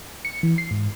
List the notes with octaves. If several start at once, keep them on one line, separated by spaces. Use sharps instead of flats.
C#7
E3
C7
G#2